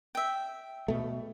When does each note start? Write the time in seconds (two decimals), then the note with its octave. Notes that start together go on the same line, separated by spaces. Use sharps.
0.15 E5 G5
0.88 B2 A3